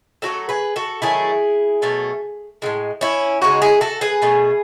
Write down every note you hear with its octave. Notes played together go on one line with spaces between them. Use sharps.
C#3 F#3 A3 F#4 A4
G#4 B4
F#4 A4
D#3 F#3 A3 E4 G#4
B2 F#3 A3
A2 E3 G#3
C#4 E4
C#3 E3 G#3 D#4 F#4
E4 G#4
F#4 A4
G#4 B4
B2 A3